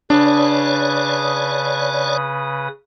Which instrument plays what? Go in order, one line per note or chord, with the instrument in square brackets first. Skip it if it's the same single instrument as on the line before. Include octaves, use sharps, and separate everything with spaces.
[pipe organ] C#3 B4 D#6 [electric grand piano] D4 [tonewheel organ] C#5 D5